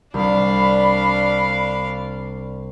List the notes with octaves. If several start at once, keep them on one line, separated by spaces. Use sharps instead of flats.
C2 D4 F5 B5